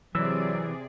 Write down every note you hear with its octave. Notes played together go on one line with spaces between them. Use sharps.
C3 E3 F#3 G#4 D5 E6